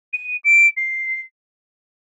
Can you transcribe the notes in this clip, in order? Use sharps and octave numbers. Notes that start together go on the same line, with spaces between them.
D#7
D7
C7